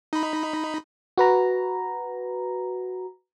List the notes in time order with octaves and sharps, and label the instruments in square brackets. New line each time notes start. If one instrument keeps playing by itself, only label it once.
[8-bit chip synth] D#4 B5
[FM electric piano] F#4 B4 A#5